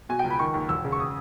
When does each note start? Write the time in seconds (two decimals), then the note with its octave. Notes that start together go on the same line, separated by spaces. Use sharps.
0.09 B2 G#5
0.19 G5
0.24 C#2
0.30 B5
0.39 D#3 C#6
0.54 D#2
0.69 E1 E6
0.84 C#3
0.92 C#6
1.00 D#6